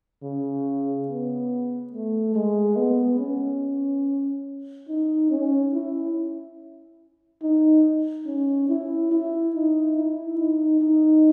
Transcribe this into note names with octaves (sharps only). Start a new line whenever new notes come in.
C#3
B3
A3
G#3
B3
C#4
D#4
C#4
E4
D#4
C#4
E4
E4
D#4
E4
D#4
D#4